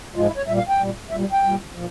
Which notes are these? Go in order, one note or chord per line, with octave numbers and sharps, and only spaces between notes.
G#2 F3 G#3 F4
E4
C#5
A#2 G3 E5
F5
G5
A#2 G3
A#2 G3 E5
G5
A#2 G3
A#2 F3